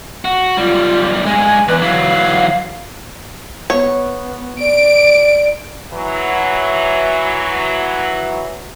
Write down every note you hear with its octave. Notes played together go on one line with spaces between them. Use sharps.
F#4
B1 G3 F4
G2 G#3 G#5
E2 B4
E3 F#3 F5
B3 C#5
D5 D7
E3 F#3